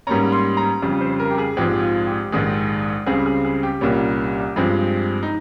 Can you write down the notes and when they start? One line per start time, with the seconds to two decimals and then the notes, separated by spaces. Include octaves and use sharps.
0.07 G#2 G3 A#3 C#4 A#5
0.32 C6
0.57 A#5
0.82 F2 C#3 G3
1.01 C5
1.20 A#4
1.31 G4
1.38 G#4
1.57 A#1 G#2 F3 G#3 C4 G4
1.82 F4
2.07 G4
2.32 A#1 G#2 D#3 G#3
3.06 C#2 C#3 G3 C4 G#4
3.26 G#4
3.45 G#4
3.63 G4
3.81 C2 A#2 G3 A#3 C#4
4.56 G2 F3 G#3 C4
5.23 D#4